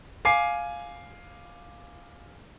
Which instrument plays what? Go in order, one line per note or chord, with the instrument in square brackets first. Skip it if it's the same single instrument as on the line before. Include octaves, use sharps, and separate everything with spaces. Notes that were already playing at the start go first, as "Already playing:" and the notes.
[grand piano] F5 G#5 D6 C7